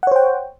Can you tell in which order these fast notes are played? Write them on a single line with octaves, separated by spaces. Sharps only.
F#5 C#5 C5 G5